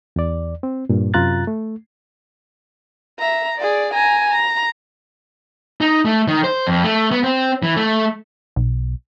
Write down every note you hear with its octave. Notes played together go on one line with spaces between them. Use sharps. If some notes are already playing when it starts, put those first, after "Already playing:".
E2 D5
C4
G2 A#2
F#2 C3 F4 A#5 F#6 A6
A3
E5 A#5
G#4 D5
G#5 A#5
A#5
D#4
A3
D#3
C5
F2
A3
B3
C4
E3
A3
B1